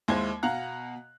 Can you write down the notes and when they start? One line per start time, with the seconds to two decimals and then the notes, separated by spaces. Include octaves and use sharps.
0.08 D#2 G#3 E4 C5 G#6
0.43 B2 F5 F#5 A#5 F#6